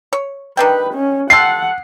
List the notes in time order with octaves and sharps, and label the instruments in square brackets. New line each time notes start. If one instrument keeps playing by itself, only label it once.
[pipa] C#5
[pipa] D#3 D4 G5 [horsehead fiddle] B4
[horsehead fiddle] C#4
[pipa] G3 F4 A4 [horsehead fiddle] F#5 [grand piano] C7